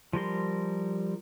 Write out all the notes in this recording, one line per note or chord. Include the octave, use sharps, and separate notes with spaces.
F3 G3 A#4 C6